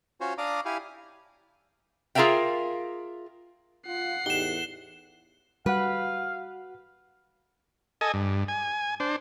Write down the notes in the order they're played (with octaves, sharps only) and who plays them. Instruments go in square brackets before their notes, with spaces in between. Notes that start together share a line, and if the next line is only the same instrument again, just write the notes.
[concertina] C#4 F4 F#4 C5 C#5
D4 D5 F5 A#5 D6 D#6
E4 G4 F5 G#5
[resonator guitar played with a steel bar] F4 G#4 A#4 E5 F5 G5
[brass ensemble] F4 [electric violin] F#5 C7
[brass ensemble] E2 A2 [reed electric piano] D#4 G4 [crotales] E7 G7
[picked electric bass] G3 [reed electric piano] F#4 F#5 [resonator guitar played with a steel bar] B4 [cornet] F5
[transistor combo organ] A4 D#5 G#5
G2
G#5
D4 C5